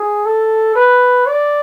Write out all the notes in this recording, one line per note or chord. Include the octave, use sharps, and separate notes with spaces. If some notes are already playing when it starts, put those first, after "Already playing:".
Already playing: G#4
A4
B4
D5